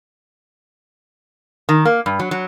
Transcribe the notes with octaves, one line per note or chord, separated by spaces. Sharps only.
D#3
A#3
G2
F#3
F#3